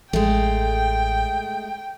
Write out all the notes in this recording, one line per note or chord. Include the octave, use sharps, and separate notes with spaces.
A1 G#3 A3 G5